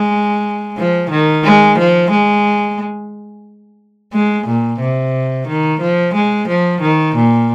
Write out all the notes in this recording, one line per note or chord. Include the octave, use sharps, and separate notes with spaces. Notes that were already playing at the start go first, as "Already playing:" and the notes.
Already playing: G#3
F3
D#3
G#3
F3
G#3
G#3
A#2
C3
D#3
F3
G#3
F3
D#3
A#2